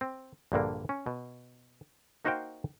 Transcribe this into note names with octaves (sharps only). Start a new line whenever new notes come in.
C4
A#1 G2 D3 A#3
C#4
B2
A#3 D#4 F#4 C5 F5 G5